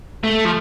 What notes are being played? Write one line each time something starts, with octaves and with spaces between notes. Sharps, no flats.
A3
F3